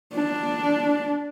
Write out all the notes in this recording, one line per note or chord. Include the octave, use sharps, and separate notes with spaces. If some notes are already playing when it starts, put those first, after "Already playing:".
D4